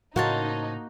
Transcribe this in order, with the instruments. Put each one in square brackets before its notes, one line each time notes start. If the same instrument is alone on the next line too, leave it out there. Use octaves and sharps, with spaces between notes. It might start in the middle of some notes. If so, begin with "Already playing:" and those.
[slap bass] A2 C#3 [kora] A#3 F#4 [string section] D#4 [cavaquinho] C5 C#5 A5